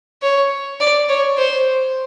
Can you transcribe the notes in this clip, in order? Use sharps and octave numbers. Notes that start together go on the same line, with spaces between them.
C#5
D5
C#5
C5